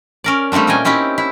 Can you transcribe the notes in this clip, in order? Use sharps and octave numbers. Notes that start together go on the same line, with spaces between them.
C#4 A#4 D5
G3 A3 A#3 C4 D4
A#2 C#4 D#5 G5 G#5
C4 C#4 D#4 E4 G4
E4